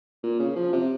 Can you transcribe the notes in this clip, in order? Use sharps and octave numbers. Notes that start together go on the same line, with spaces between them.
A#2
C#3
F3
C3